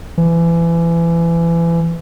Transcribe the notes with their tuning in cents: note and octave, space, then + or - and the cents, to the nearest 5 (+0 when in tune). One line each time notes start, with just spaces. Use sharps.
E3 +30